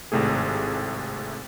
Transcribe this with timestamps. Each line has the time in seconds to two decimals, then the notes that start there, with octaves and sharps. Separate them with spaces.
0.12 G#1 A2 C3 A3 G#4